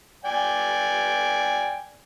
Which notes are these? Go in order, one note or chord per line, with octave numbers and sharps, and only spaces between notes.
D5 G5 G#5